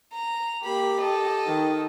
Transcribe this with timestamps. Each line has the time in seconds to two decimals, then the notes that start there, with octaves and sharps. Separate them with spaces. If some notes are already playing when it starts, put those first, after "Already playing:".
0.12 A#5
0.63 A#3 G4 B5
1.00 A4 D#5
1.47 D#3